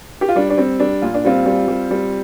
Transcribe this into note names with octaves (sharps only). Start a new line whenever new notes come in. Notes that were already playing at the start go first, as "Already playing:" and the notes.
G4
F4
G3 D4
D4
G3 C4
G3 D4
A#2 F4
D4
G3 C4 F4
G3
G3
G3